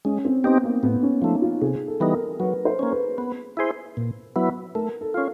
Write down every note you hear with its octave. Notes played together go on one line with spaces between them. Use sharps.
G#3 C#4
C4
B3 C4 D#4 G4
A#3
A2 B3
C#4
F3 A3 D#4
F4
C3 G#4
A4
E3 G3 B3 D#4
A#4
F#3 B4
C5
A#3 C#4
B4
B3
E4 G#4 C5
A#2
F#3 B3 E4
A3 A#4
A4
C#4 F4